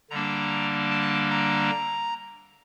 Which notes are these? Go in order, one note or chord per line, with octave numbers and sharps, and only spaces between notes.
D3 G3 A#3 D4 A#5
A5
A#5